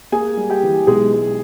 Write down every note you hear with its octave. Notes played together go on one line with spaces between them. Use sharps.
A#3 G#4 G#5
G3
G4 G5
E3
B1 G#3 G#4
G#3